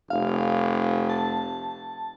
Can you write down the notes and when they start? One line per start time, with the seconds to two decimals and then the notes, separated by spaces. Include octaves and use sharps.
0.10 F1 F5
1.10 A5